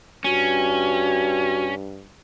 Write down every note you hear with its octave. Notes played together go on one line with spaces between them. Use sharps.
G2 C#4 F#4